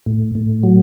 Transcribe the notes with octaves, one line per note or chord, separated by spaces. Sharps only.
A2
A2
F#3